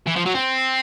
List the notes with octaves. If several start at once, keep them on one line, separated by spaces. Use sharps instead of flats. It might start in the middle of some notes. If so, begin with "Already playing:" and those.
E3
F3
F#3
C4